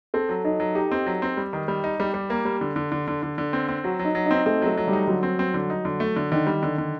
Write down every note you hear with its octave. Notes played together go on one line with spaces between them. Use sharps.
C4 A4
F#3
F#3 D#4
F#3
D#4 G4
C4
F#3
C4
G3
D#3
G3
D#4
G3 G4
G3
A#3
G3
D3
D3
D3
D3
D3
D3
C4
C4
F#3 F#4
F#3
D#4
F#3
D#4
C4
A3 C4
F#3 A3
F#3
G3
D#4
D3 F#3
C4
C4
D3
D#4
D3
A3
D3
D3 D#3
G3
D3
D3